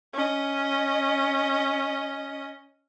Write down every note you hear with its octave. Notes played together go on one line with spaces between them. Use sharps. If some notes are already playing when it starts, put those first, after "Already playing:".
C#4 D#5